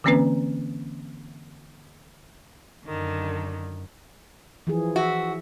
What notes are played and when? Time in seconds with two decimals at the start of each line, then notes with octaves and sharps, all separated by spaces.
0.04 D3 E3 A#3 C4 C#4 B4
2.86 F#2 D3 D#3
4.67 E3 F3 G#4
4.96 F#4 E5